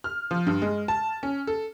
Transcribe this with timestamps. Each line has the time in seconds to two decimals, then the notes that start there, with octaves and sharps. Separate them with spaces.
0.04 F6
0.31 F3
0.47 G2
0.62 G#3
0.88 A5
1.23 C#4
1.47 A4